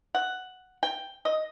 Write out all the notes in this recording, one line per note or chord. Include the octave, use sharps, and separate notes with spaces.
F#5
G5
D#5